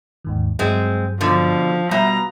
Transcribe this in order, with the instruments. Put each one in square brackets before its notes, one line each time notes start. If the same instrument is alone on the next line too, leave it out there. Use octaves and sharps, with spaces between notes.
[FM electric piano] D#2 G#2 D#3
[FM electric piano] G2 F#3 [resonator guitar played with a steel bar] G#3 C4
[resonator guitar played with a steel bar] B2 D3 [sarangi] F3
[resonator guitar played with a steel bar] B2 [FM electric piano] G3 E5 F#5 [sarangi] A#5